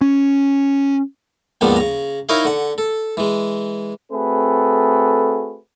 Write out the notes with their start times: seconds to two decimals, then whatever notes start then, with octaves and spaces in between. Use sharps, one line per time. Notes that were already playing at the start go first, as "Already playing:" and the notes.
0.01 C#4
1.61 D#2 G#2 D#3 F3 B3 D4
1.76 C#3 A#5
2.29 D#4 E4 A#4 C#5 D#5 F5
2.45 D3 F#5
2.78 A4
3.17 E3 G#3
4.12 A3 C4 F#4 G#4 A4 B4